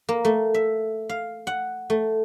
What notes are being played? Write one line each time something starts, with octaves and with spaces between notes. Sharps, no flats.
A#3
A3
E5
F5
F#5
A3